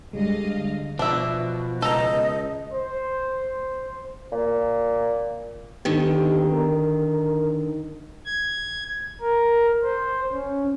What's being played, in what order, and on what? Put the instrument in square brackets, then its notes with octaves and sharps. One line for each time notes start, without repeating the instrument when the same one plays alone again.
[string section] D2 D#5 F5 [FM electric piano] G3 G#3
[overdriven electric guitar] B2 [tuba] F3 [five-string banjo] D4 E5
[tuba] C#2 [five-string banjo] A4 A#5 [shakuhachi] D#5
[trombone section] C5
[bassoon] A#2
[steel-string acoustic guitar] D3 D#3 [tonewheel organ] B3 G4
[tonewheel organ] A#4
[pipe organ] G#6
A#4
C5
C#4